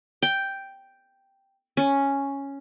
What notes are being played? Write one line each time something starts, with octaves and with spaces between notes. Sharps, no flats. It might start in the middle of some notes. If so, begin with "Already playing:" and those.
G5
C#4